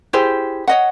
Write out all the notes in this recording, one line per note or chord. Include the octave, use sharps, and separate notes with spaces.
E4 G4 G#4 C5
C#5 D#5 F#5